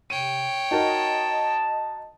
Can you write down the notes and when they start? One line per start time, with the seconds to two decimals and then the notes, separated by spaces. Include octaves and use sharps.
0.10 C3 C#5 G5 D#7
0.71 D#4 F#4 A#4 D#5 A5